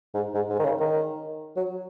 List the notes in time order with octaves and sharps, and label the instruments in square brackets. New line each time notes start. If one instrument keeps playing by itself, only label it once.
[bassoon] G#2
G#2
G#2
D#3
C#3
D#3
F#3